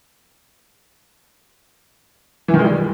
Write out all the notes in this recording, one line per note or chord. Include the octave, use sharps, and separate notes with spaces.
E3
D#3
G#3
G3